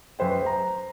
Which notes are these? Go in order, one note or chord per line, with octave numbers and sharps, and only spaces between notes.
F#2 B4 C5 G5
C5 A#5